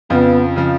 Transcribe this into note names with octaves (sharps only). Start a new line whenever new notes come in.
F2 C#3 F3 B3
C#3 F3